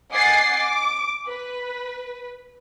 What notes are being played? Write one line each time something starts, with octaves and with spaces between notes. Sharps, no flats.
D#5 F#5 G#5 D6 A6 C7
D6
B4